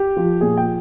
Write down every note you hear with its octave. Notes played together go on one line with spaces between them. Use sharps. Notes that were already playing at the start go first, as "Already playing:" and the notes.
Already playing: G4
F3
A#2 G#4
G5